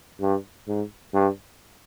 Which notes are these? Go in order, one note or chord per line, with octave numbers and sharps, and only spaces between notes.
G2
G#2
G2